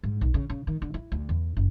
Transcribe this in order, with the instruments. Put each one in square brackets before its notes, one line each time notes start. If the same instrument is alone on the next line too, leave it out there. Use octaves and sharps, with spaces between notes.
[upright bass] G#2
B1
C#3
C#3
D#3
D3
E4
D2
E2
F#1